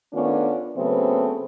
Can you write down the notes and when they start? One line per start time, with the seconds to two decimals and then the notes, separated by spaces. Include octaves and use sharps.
0.14 D#3 A3 B3 C#4 D4 F4
0.77 C#3 F#3 A3 B3 C4